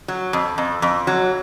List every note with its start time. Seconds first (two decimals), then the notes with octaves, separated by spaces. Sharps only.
0.08 F#3
0.33 F2
0.58 F2
0.82 F2
1.07 F#3